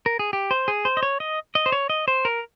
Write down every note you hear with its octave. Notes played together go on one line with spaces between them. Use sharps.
A#4
G#4
G4
C5
G#4
C5
D#5
C#5
D#5
D#5
C5
C#5
D#5
C5
A#4